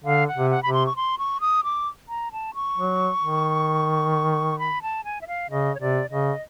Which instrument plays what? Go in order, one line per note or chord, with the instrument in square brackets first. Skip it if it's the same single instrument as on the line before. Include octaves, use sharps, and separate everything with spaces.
[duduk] D3 [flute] F5
[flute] F#5
[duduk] C3
[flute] F#5
[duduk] C3 [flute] B5
[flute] C6
C#6
C6
C#6
D#6
D6
A#5
A5
C#6
[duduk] F#3
D#3
[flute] B5
A5
G#5
E5
F5
[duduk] C#3 [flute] D#5
[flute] C#5
[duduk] C3 [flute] D5
[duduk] C#3 [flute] D#5